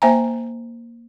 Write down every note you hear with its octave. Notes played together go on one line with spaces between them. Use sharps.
A#3 C5 E5 G5 G#5 A#5